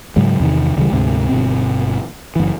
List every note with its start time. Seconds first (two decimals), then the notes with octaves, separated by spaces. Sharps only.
0.16 G#2 C#3 F#3 G#3
0.40 E2 C3 D#3
0.76 D1 C#3 E3 G3
0.92 D2 G#2 C3
1.29 G1 B2 C4
2.36 F#1 E3